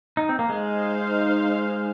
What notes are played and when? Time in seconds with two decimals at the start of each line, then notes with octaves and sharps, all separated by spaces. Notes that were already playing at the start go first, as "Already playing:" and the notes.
0.17 D#4
0.29 C4
0.39 A#3
0.49 G#3 D#4 C5 F5